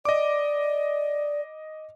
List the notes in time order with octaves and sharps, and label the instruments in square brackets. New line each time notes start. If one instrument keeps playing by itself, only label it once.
[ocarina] D5 [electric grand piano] D#5 D6